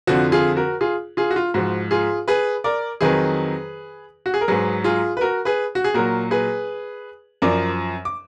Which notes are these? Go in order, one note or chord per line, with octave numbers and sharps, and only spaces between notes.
F2 D3 F3 F#4
F4 G#4
F#4 A#4
F4 G#4
F4 G#4
F#4
F4
G#2 F3 F#4
F4 G#4
G#4 B4
A#4 D5
F2 D#3 F#3 G#4 B4
F#4
G#4
A#4
G#2 F#3 G#4 B4
F4 G#4
B4
F#4 A#4
G#4 B4
F#4
G#4
A#2 F#3 F#4 A#4
G#4 B4
F#2 F3 A#4 D5
D6